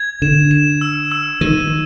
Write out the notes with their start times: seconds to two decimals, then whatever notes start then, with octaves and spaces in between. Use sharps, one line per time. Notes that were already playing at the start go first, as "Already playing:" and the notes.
Already playing: G#6
0.22 D3 E7
0.51 E7
0.81 E6
1.12 E6
1.41 D#3 D#7